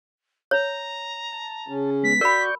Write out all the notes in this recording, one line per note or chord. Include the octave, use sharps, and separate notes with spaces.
C#5 A#5
A5
C#3 C#4
G#3 B3 B6
F#4 A#4 D5 B5 C#6 G6